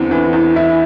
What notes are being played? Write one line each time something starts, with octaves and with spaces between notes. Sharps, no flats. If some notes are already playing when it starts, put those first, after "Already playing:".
Already playing: E2 D3 C4
E3
E2
E4